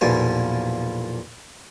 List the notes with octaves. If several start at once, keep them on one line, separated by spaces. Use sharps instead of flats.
B1 E2 A#2 F3 A#3 G#5